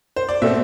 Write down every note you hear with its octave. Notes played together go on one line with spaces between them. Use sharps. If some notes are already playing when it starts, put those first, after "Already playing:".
C5
D5
B2 A3 C4 E5